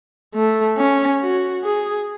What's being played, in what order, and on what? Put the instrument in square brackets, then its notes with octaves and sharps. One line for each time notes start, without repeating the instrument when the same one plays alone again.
[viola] A3
C#4
F#4
G#4